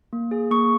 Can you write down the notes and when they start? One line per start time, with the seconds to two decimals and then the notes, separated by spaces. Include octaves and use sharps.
0.13 A#3
0.31 G#4
0.51 A#3 C#6